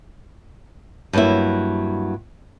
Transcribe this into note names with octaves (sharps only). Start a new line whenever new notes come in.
G2 F#3 G3 A#3 E4